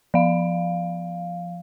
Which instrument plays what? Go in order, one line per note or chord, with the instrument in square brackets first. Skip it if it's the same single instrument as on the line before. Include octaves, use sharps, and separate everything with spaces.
[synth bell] F3 F5